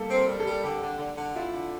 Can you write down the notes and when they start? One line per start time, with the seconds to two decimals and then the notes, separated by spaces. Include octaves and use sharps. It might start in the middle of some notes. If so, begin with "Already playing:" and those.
Already playing: G3 A#3 A4
0.09 C4
0.15 A#4
0.27 G3
0.40 A4
0.46 G3
0.63 D3 G4
0.82 D3
0.99 D3
1.17 D3
1.35 E4 F4
1.53 D3